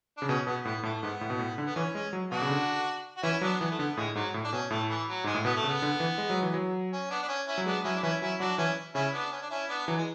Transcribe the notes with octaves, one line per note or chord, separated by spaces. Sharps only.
C#3 D4
B2 C#4
B2 B3
A2 B3
A2 A3
G#2 B3
A2
B2
A2
D3
B3
E3 C#4
G#3 C#4
F#3
B2 D4 F#4
C#3
D3
F#4
E3 C#4 E4
F#3 B3 D4
E3 B3
A3
D3 B3
A2 G#3
G#2 F#3
A2
D4
B2 C#4
A2 A3
E3
F#3
G#2 G#3
A2
B2 B3
A3
C#3
B3
D3
E3
G#3
F#3
E3
F#3
C#4
B3 D4
D4
C#4
C#4 E4
F#3
G#3 B3 D4
F#3 C#4 E4
D4
E3 C#4 E4
F#3 C#4 E4
F#3 D4 F#4
E3 C#4 E4
C#3 C#4 E4
B3 D4
C#4
D4
C#4 E4
B3 D4
E3 F#3
G#3